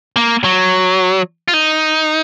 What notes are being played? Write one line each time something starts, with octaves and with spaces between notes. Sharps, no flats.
A#3
F#3
F4
D#4